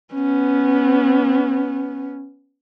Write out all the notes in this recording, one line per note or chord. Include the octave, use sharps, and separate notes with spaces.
B3 C#4